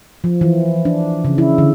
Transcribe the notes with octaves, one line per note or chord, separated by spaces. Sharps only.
F3
E3
D4
C#3
E4
D3